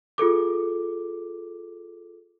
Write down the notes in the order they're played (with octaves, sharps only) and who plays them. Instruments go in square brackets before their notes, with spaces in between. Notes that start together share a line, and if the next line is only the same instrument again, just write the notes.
[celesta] F4 G#4 A4 D6